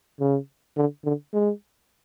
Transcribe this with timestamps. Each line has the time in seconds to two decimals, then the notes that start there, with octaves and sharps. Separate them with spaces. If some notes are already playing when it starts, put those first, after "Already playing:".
0.20 C#3
0.77 D3
1.05 D3
1.33 G#3